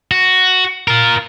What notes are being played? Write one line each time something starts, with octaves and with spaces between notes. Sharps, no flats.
F#4
F4 A#4